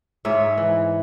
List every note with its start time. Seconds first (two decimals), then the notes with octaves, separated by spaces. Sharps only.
0.25 G#2 C#5 E5
0.58 E3